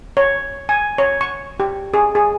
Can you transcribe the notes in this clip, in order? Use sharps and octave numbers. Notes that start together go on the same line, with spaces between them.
C#5
G#5
C#5
C#6
G4
G#4
G#4